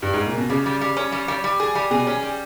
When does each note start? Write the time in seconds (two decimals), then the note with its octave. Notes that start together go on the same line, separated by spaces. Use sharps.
0.02 G2
0.13 G#2
0.26 A#2
0.37 B2
0.50 C#3 G3
0.66 G3
0.81 G3
0.97 C#4
1.12 G3
1.28 G3
1.44 G3
1.60 G#4
1.75 G3
1.91 B2 G#4
2.07 C#4
2.23 G3